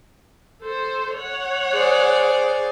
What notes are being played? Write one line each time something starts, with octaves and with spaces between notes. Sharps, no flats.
A4 C5
C#5 F#5
G#4 C5 D5 G#5